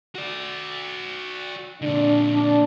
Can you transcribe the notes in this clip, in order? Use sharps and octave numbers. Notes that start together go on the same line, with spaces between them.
F#4 D5
A#2 D3 D4
D4